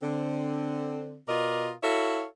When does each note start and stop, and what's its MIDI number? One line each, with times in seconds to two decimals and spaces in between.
0.03 1.19 50
0.03 1.19 60
1.29 1.71 47
1.29 1.71 65
1.29 1.71 70
1.29 1.71 74
1.29 1.71 75
1.83 2.25 64
1.83 2.25 66
1.83 2.25 69
1.83 2.25 73
1.83 2.25 76
1.83 2.25 77